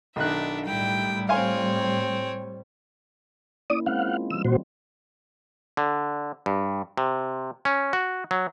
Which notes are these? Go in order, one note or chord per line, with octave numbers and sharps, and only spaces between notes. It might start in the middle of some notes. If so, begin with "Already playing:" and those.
B1 D#3 D4 E5 F#6
A2 G3 E4 G5
C4 C#5 F5 G#5 C6
A#3 C#4 E4 D5 D#6
G#3 C4 C#4 F5 F#5
F4
E3 G3 E6
A#2 F#4 C5
D3
G2
C3
C#4
F#4
F#3